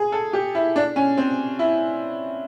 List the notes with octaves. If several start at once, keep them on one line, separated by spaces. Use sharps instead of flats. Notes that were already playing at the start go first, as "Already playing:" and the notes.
Already playing: G#4
A4
G4
E4
D4
C#4
C4
E4